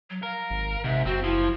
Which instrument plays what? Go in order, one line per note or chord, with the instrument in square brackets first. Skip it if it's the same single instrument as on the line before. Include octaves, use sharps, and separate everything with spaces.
[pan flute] F#3
[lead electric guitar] A#4 [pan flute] F5
[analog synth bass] G#1
[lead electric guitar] G#2 [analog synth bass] C3 [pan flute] E5
[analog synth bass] F#1 [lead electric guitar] C4 [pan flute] F#4
[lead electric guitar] F3 [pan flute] E4